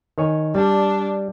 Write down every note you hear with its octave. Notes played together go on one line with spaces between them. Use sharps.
D#3 C#5 G#5
G3 D4